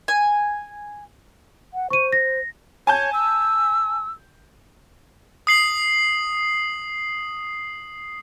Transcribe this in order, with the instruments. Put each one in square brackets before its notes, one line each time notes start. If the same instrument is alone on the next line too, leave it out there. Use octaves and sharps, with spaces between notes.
[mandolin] G#5
[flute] F#5
[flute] C5 [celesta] C#6 D#7
[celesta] A#6
[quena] C#5 [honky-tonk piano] G#5 A5 G6
[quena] E6
[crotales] D#6 C7 F#7